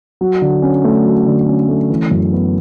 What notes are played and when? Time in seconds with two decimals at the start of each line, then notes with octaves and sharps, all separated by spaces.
0.21 F#3
0.42 D3
0.62 C#4
0.84 A3
1.05 F#3
1.26 D3
1.47 C#4
1.69 A3
1.90 E3
2.11 F#2
2.32 B3